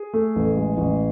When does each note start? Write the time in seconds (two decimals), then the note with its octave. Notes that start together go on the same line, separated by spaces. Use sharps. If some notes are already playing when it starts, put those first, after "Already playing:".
Already playing: G#4
0.13 A3
0.36 A1
0.57 G#3
0.77 A1